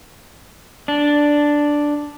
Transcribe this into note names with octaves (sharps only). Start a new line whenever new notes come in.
D4